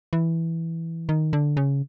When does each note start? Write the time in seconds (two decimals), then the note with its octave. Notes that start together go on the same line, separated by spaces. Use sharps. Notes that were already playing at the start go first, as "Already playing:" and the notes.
0.13 E3
1.09 D#3
1.33 D3
1.57 C#3